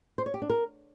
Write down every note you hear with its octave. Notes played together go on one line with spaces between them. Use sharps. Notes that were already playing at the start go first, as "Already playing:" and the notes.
C5
C#5
G4
D4
A#4